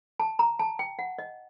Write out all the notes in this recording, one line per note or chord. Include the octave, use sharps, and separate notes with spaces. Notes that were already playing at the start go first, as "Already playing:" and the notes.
A5
A#5
A5
G5
F#5
D#5